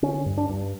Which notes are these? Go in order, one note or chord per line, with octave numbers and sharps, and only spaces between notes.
D3 C#4
G2
D4
G2